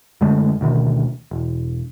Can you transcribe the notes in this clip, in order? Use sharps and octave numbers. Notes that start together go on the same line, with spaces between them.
F#2 D3 G#3 A3
D2 B2 D#3
E1